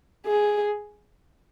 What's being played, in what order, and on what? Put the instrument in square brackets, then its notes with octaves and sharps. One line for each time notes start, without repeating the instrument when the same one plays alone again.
[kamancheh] G#4